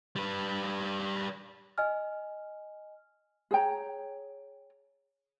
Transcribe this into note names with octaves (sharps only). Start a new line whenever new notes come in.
G3 B4
D#5 G#5 F6
G#4 C#5 G5 A#5